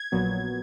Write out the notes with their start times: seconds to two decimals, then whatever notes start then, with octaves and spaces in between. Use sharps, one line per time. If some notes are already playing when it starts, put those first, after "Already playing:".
Already playing: G#6
0.12 A#1 A#2 F#3 B3